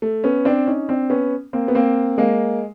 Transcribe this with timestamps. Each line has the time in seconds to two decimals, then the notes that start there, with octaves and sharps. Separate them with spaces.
0.02 A3
0.24 B3 C#4
0.45 C4 D4
0.67 C#4 D#4
0.89 C4 D4
1.10 B3 C#4
1.53 A#3 C4
1.68 B3
1.75 A#3 C4
2.18 G#3 A#3